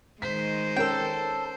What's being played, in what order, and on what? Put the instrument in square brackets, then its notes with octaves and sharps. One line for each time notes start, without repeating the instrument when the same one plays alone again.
[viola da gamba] D#3 G#3 [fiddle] C5 [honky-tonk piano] B6
[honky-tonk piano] C#4 A#4 [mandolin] A4 G5